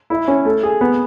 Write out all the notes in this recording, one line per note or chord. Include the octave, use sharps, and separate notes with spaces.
E4
C#4
A3
G#4
B3